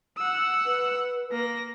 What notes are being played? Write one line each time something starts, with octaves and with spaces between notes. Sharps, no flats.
F#5 E6
B4
A#3 A#6